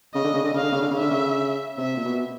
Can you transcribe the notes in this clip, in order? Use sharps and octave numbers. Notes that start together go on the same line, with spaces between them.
C#3 D#5
D3
C#3
D3
C#3 F5
D3
C#3
D3
C#3
D3 E5
C#3
C3 E5
A#2
B2